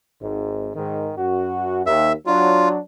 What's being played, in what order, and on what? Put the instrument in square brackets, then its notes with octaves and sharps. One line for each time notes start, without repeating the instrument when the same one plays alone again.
[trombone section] G#1 G#2
G#2 D#3
F#2 F#4
[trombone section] D#2 [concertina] E5
[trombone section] F#3 D4 [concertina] F4